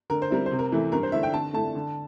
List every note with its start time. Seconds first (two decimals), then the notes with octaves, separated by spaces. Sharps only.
0.10 D3 A#4
0.22 C5
0.30 G3 C4 E4 A#4
0.46 C3 C5
0.59 A#4
0.72 E3 A3 E4
0.92 G2 A#4
1.03 C5
1.12 D3 A3 E4 E5
1.23 G5
1.33 D3 A5
1.53 A3 E4 A5
1.75 D3